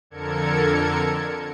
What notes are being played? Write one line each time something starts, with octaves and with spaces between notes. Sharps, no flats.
F2 D3 A4 A#4 G#6 C#7